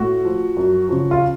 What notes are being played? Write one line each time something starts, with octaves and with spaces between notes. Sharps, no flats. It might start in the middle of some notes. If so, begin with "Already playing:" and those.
Already playing: A2 F#4
F3
F#2
C#3 F3
F4